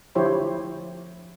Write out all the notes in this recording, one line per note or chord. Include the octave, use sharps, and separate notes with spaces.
D3 F3 E4 G4 C5 C#5